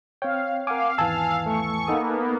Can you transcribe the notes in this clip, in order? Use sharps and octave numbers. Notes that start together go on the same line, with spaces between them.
C4 C#5 F5 G5
A#4 F5 F#5 G#5 D6
G#1 E2 E3 G#5 A5 E6
A3 C#6
A#3 B3 D#4 A4 D#6